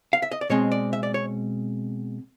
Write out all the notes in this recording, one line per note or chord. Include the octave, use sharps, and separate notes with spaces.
F5
E5
D#5
D5
B2 G#3 C4 C#5
D5
E5
D5
C#5